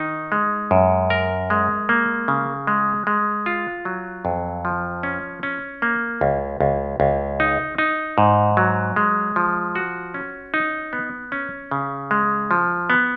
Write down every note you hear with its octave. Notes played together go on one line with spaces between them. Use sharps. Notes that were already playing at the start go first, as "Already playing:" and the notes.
Already playing: D#3 D#4
G#3
F#2
A#4
G#3
A#3
C#3
G#3
G#3
F4
F#3
F2
F3
C#4
C#4
A#3
C#2
C#2
C#2
D#4
D#4
G#2
F#3
G#3
F3
F#4
C#4
D#4
B3
C#4
C#3
G#3
F3
B3